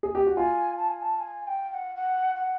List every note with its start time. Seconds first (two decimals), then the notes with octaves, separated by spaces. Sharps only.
0.03 G#4
0.15 G4
0.26 F#4
0.37 F4 G#5
0.77 A5
0.89 G#5
1.02 A5
1.17 A5
1.20 G#5
1.43 G#5
1.47 G5
1.69 G5
1.74 F#5
1.96 F#5
2.36 F#5